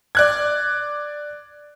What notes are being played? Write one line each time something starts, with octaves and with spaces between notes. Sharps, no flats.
D5 F#6 G#6